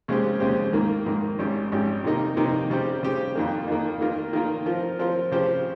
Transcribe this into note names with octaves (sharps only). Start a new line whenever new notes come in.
D#2 C#3 G#3 C4 G4
D#2 C#3 G#3 C4 G4
G#2 D#3 A#3
G#2 D#3 A#3
G#1 G#2 G3 C#4 G4
G#1 G#2 G3 C#4 G4
C3 D#3 A#3 D#4 A#4
C3 D#3 A#3 D#4 A#4
C#3 G3 C4 G4
C#3 G3 C4 G4
F2 D#3 A#3
F2 D#3 A#3
D#3 A#3 F4 A#4
D#3 A#3 F4 A#4
F3 C4 F4 A#4
F3 C4 F4 A#4
C#3 F3 C4 G4 C5